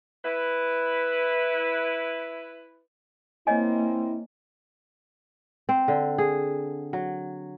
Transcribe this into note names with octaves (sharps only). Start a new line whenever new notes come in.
E4 B4
A#3 C4 E4 C#5 D#5 G#5
C4
D3
G#4
F#3